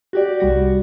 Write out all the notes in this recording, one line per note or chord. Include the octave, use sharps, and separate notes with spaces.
F#4 G4 D5
C2 G3 F#4